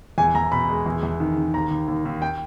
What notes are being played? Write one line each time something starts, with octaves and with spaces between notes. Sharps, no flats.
E2 G#5
E2 A#5
B2 B5
G#3
E2
E2
D#3
D#3
D#2 A#5
D#2
D#2
D#2
G5